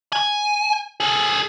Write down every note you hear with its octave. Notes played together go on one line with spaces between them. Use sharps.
G#5
G#4 A4